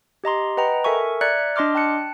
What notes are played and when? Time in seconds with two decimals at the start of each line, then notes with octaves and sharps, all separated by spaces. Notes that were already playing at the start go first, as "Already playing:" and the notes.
0.24 G4 D#5 A#5 C6
0.57 B4 D#5 F#5 G5 A#5 B5
0.84 A4 A#4 E5 G#5 C#6
1.21 D5 E5 A#5 F#6 G#6 C#7
1.56 D4 D#5 C6 D6 F6
1.75 G5 A5 F#6 C#7